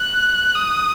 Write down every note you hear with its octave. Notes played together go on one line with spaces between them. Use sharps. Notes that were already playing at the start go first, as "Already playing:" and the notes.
Already playing: F#6
D#6